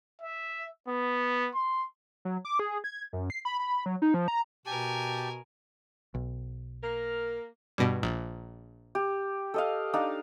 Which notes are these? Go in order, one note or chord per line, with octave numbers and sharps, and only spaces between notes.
E5
B3
C6
F#3
D6
G#4
G#6
F#2
C7
B5
B5
F#3
D#4
F3
A#5
B2 G4 A#4 G#5 A5
B1
A#3 A#4
G2 B2
A#1
G4
A4 D#5 F5
D4 D#4 F5